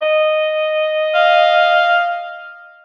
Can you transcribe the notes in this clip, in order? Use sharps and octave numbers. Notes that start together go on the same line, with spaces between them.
D#5
F5